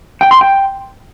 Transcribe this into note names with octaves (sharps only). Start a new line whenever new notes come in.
G5
C6
G5